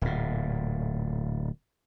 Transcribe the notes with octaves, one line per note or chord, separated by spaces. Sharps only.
D1 A#2